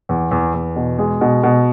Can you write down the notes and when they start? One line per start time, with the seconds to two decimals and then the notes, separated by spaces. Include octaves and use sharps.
0.09 E2
0.31 E2
0.54 E2
0.76 B2
0.99 G#3
1.21 B2
1.43 B2